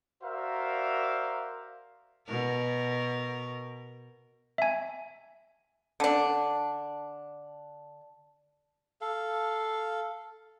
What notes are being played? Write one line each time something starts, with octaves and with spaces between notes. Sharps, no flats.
F#4 A#4 C5 D5 E5 F5
B2 A#4
E5 G#5
D3 D4
A4 F5